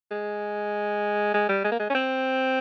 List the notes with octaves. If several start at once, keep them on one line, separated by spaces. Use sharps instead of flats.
G#3
G#3
G3
G#3
A#3
G#3
C#4
C4